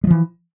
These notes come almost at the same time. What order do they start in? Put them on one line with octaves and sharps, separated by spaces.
G#3 F3 E3